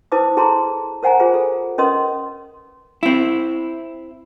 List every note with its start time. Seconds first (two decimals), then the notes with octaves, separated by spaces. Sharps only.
0.12 E4 B4 C5 A5 D6 D#6
0.37 E4 G#4 A4 A5 A#5 C6
1.03 A#4 C5 F#5 G#5 A#5
1.20 F4 G#4 C5
1.34 A4
1.78 C#4 A#4 B4 D#5 C6 D#6
3.03 C4 E4